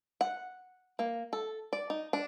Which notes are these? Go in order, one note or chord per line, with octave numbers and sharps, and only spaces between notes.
F#5
A#3
A4
D5
D#4
D4